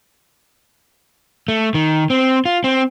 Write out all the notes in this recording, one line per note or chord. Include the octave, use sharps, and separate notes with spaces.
A3
D#3
C4
F4
C4